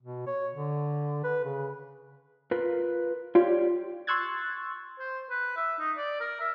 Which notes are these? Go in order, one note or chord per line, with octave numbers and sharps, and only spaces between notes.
B2
C#5
D3
B4
C#3
F4 A#4 B4
F4 G4 C#5 D5
C6 C#6 E6 F#6 G#6 A6
C5
B4
E5
D#4
D5
A#4
E5